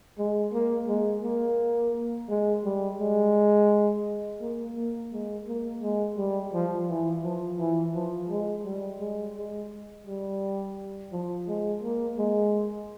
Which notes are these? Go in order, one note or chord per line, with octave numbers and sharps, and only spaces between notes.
G#3
A#3
G#3
A#3
G#3
G3
G#3
A#3
A#3
G#3
A#3
G#3
G3
F3
E3
F3
E3
F3
G#3
G3
G#3
G#3
G3
F3
G#3
A#3
G#3